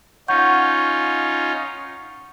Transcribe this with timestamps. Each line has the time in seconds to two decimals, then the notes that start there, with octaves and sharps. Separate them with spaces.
0.28 C#4 D#4 F4 F#5 C#6 G6